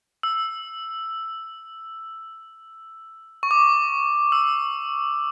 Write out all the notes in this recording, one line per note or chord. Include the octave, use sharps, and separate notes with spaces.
E6
C#6
D6
E6